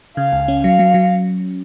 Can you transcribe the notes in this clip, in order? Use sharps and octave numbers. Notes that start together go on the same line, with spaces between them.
C#3 F5
C#2
C#4
F#3 F5
F#3
F#3